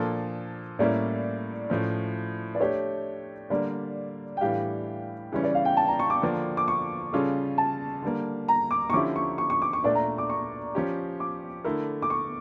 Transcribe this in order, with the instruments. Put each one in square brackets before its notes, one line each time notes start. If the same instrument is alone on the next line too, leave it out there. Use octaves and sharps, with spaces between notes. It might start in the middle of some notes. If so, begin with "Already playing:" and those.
Already playing: [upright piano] A#2 F3 A#3 D4 A4
[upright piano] A2 G3 A#3 C#4 E4 [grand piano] D5
[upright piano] A2 F3 C#4
[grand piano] D5
[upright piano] A3 D4 G4 [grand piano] C#5
[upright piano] D3 G3 A#3 [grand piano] D5
[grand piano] G5
[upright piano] A2 E3 G3 D4 G4 [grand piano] F5
[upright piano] C#3 E3 G3 C#4
[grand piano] D5
F5
G5
A5
A#5
C#6
D6
[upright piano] D3 F3 A#3 D4
[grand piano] D6
C#6
[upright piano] C#3 G3 C#4 F4 A4
[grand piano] A5
[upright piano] D3 G3 A#3
[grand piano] A#5
D6
C#6
[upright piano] D3 F3 C#4 E4 G4 [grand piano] D6
[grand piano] C#6
C#6
C#6
D6
C#6
[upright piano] A#2 A3 D4 [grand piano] D5
[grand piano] A#5
D6
C#6
[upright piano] F3 C#4 G4
[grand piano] D6
[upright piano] D3 A3 E4 A#4
[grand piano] D6
C#6